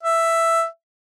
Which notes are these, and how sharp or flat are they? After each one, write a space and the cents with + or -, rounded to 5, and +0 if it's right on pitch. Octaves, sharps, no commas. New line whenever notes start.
E5 +5